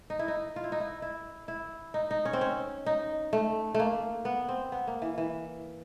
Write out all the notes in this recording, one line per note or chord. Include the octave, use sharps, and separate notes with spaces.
D#4
E4
D#4
F4
E4
D#4
E4
E4
E4
D#4
D#4
C#4
C4
C#4
D#4
A3
A3
A#3
B3
C4
B3
A#3
E3
E3